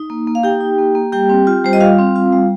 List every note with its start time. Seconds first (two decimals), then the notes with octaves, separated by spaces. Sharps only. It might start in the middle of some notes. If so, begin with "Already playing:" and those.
Already playing: D#4
0.10 A#3
0.27 A#3
0.35 F5
0.43 D#4 G4 G5
0.61 D#4
0.78 A#3
0.95 A#3
1.12 G3 G4 G5
1.29 C4
1.47 F4
1.64 G3 C5
1.73 D#5
1.80 G3 F4 F5
1.98 C4
2.16 F4
2.33 G3